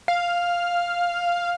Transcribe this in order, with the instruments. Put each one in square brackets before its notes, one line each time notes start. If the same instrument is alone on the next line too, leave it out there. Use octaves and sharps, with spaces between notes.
[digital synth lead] F5